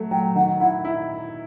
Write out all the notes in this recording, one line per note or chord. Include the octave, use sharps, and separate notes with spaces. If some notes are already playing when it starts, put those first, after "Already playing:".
Already playing: F#3 A3
F#3 G5
D#3 F#5
E4 F#5
E4